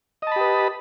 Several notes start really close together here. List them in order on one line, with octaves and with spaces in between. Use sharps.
D#5 A5 B5 G4 B4